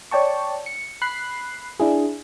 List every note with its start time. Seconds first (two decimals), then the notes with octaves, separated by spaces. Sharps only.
0.11 C#5 D5 G5 A5 C#6
0.66 C#7
1.02 B5 F#6 C7
1.80 D4 E4 G#4